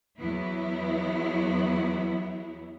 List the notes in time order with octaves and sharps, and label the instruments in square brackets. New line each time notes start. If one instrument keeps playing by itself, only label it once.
[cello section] E2 F#3 B3 E4